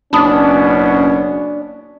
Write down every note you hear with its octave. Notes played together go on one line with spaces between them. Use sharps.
F#1 B2 C#4 D4 A5 B5 D#6